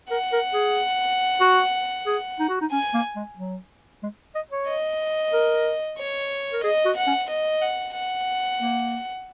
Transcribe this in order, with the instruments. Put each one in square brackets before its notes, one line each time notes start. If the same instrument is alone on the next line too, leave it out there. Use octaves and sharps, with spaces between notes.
[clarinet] A#4 [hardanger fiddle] F#5
[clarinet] A#4
G#4
F#4
G#4
D#4
F#4
D#4
[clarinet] C#4 [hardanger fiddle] G#5
[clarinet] A#3
G#3
F#3
G#3
D#5
C#5
[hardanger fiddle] D#5
[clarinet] A#4
[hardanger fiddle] C#5
[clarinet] A#4
[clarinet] G#4 [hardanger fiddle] D#5
[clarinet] F#4
[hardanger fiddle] F#5
[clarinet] C#4
[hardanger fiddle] D#5
F#5
F#5
[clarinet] A#3